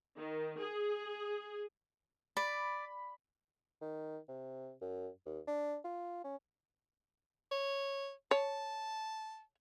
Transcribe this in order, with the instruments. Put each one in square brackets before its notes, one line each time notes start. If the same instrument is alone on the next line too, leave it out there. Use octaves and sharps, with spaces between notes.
[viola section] D#3
G#4
[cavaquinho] D5 [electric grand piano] B5
[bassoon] D#3
C3
F#2
D#2
D4
F4
C#4
[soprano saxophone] C#5
[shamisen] C#5 [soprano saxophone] A5